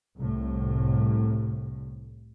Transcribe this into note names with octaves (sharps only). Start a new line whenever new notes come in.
C2 A2